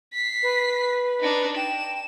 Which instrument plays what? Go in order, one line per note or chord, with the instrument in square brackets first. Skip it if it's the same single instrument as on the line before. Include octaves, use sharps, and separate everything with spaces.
[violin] B6 C7
[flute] B4
[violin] D4 D#4
[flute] G5 [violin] E7